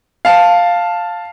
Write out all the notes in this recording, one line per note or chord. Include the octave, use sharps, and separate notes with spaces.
F5 A5